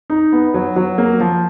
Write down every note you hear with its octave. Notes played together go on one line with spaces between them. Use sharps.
D#4
B3
F#3
F#3
A#3
F3